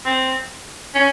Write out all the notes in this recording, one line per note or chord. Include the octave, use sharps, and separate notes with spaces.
C4
C#4